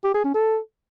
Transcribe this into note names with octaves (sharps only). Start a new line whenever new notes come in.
G4
G#4
C#4
A4